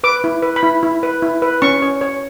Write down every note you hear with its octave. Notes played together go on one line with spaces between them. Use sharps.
B4 D6
E4
B4
B5
E4
E4
B4
E4
B4
C#4 C#6
C#5
C#5